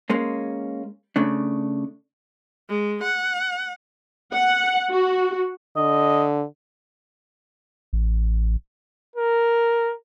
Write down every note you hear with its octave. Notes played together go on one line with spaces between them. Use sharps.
G#3 A#3 C#4
C#3 A3 D4
G#3
F#5
F#5
F#4
D3 D#5
A1
A#4